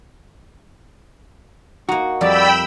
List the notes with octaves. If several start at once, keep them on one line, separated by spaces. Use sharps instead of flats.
A#3 D#4 F#4
F2 G3 D5 G5 B5 E6